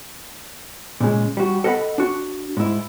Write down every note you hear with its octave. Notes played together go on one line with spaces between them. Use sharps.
A#2 C#3 G#3
G3 F#4
A4 D#5 F#5 G#5 B5
D4 F#4
G#2 E4